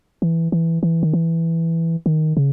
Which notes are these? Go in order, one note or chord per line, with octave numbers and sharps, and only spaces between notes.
E3
E3
E3
D#3
E3
D#3
C#3